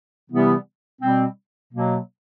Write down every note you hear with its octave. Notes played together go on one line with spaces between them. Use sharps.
C3 E3 G3 B3 E4
B2 G3 C4
B2 F#3 A#3